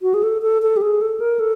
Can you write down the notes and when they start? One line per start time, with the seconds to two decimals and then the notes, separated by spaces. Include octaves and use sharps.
0.02 F#4
0.14 G#4
0.23 A4
0.42 A4
0.62 A4
0.77 G4
0.82 G#4
1.01 A4
1.20 A#4
1.39 A4